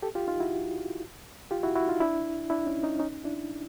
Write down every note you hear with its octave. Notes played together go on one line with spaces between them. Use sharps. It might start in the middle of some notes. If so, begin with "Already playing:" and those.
G4 A4
F4 G4
D#4 F4
E4 F#4
F4 G4
E4 F#4
E4 F#4
D#4 F4
D4 E4
D4 E4
C#4 D#4
C#4 D#4
C#4 D#4
D4 E4